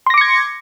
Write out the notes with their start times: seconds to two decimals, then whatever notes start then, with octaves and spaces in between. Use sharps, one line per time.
0.06 C6
0.10 A#6
0.14 D6
0.18 C#7
0.21 G#6